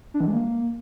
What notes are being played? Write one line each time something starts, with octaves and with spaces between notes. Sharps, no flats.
D4
E3
G#3
A#3